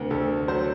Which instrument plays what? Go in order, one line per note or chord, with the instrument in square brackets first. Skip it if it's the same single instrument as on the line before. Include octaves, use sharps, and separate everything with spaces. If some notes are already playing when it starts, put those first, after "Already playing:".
Already playing: [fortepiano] D2 C3 [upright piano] A#4
[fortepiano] D2 [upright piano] A4
[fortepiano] F#3 [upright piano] C5